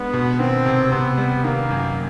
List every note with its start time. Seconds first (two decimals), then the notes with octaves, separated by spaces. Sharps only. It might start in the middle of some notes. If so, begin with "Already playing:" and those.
Already playing: G#3 B3 D4
0.13 B2
0.39 D#3 C4
0.66 C3
0.92 C3 B3
1.17 G3
1.44 D#3 A#3
1.71 F#2